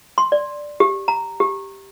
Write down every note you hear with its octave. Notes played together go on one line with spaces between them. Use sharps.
C6
D5
G4
A#5
G4